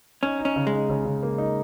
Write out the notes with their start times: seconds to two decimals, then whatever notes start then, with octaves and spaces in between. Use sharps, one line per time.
0.23 C#4 D#4
0.39 D#4
0.45 C#4
0.56 C#3
0.67 G#3
0.73 D#4
0.90 C#3
1.05 C#3
1.23 A#3
1.38 D#4